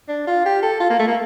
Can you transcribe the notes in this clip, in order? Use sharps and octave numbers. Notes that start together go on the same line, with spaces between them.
D4
F4
G4
A4
F4
A#3
A3
A#3